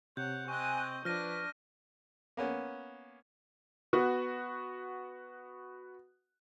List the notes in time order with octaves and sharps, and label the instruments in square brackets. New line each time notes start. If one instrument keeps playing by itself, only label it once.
[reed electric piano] C3 [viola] C#5 F#5 [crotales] G6
[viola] C4 D#5 [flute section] G#5 F#6 [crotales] C#6
[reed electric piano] F3 [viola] D4 [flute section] B4 [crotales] F6 A#6 D#7
[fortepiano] A#3 B3 C#4
[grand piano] B3 F#4